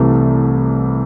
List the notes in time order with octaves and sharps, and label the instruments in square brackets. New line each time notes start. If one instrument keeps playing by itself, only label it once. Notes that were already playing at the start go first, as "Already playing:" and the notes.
Already playing: [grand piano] C2 C3 E3 A3